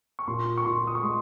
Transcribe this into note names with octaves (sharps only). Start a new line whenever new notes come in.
C#6
A#2 C6
C#6
A#2 C6
D#6
C#6
G#3 C6